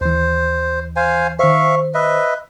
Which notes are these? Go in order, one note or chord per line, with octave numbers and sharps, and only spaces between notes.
D#2 E3 C5
C5 F5 G#5
D#3 C5 E5 F5 C#6
B4 D#5 E5